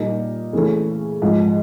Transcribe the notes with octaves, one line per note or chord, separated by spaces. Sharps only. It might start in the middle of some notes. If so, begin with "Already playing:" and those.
Already playing: A#2 G3 A#3 D#4
C#3 E3 A3 C#4
G#2 F3 G#3